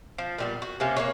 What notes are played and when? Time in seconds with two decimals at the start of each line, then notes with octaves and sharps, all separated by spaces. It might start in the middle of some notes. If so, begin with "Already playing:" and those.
0.18 F3
0.38 A#2 G3 B3
0.62 F#4
0.80 C3 A#3 C#4
0.97 A#3 B4 C#5